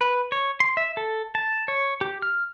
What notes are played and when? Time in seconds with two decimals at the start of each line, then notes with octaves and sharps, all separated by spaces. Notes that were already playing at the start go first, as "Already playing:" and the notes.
0.01 B4
0.32 C#5
0.60 C6
0.77 E5
0.97 A4
1.35 A5
1.68 C#5
2.01 G4
2.22 F6